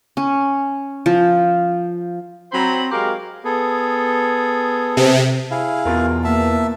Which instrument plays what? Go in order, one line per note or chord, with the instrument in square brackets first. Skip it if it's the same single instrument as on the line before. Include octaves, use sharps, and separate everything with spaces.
[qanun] C#4
F3
[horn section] F#3 C4 C5 A#5 B5
G#3 F#4 G4 A#4 F5
[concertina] B3 G#4 A4
[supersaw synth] C3
[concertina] E4 G#4 F5
[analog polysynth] E2 [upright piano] B2 F4 A#4
[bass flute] A#3 [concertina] E5 A5